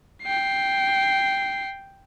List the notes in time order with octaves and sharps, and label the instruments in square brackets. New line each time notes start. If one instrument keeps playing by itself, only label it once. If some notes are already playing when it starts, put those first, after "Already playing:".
[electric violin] G5 C7